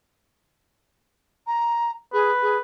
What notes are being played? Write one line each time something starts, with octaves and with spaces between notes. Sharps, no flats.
A#5
G#4 B4
G#4